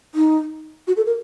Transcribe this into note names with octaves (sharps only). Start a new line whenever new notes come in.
D#4
F#4
A4
A#4